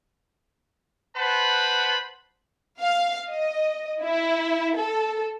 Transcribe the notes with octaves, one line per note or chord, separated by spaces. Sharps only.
B4 C5 F#5 A5 B5
F5
D#5
E4
A4